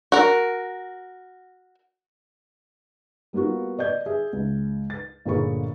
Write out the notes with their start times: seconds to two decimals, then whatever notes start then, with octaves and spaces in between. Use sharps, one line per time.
0.12 F#4 A#4
3.33 G3 A#3 B3 F4 F#4
3.79 D5 D#5 G6 G#6
4.06 G#4 E5
4.33 C#2
4.90 A6
5.25 G1 A#2 D3 G#4 B5 C#6